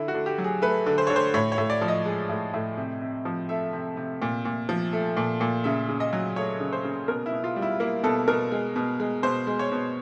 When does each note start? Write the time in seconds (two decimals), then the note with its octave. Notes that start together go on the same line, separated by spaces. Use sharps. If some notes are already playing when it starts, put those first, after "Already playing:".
Already playing: D3 E4
0.08 F#4
0.14 D3
0.26 G4
0.38 F#3
0.44 G#4
0.62 A3 B4
0.86 D3
0.98 C5
1.07 D3 C#5
1.16 C5
1.34 A2 C#5
1.52 C#5
1.58 A2
1.70 D5
1.81 F3
1.88 D#5
2.06 G#3
2.29 A2
2.54 A2
2.77 C3
3.01 C3
3.25 F3
3.49 A3 E5
3.73 C3
3.97 C3
4.22 A#2
4.45 A#2
4.69 F3
4.93 A3
5.17 A#2
5.41 A#2
5.64 C#3 E5
5.89 C#3
6.00 D#5
6.13 F#3
6.36 A3 C#5
6.60 C#3
6.73 C5
6.84 C#3
7.08 B2 A#4
7.26 E4
7.33 B2
7.44 F4
7.56 G3
7.62 E4
7.80 A#3 E4
8.03 B2 A4
8.28 B2 A#4
8.51 G#3
8.76 B2
9.00 G#3
9.23 B2 C5
9.47 G#3
9.59 C#5
9.72 B2